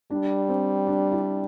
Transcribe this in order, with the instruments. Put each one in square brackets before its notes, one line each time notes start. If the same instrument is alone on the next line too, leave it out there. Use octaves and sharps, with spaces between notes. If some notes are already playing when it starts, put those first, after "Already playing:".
[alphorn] G3 [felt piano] D4
[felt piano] C4
D4
E4